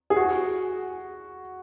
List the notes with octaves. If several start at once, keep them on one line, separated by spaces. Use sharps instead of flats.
G#4
F#4